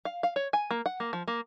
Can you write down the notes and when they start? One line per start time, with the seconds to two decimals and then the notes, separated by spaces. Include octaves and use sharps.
0.05 F5
0.23 F5
0.36 C#5
0.53 G#5
0.71 A#3
0.86 F#5
1.00 A#3
1.13 F3
1.28 A#3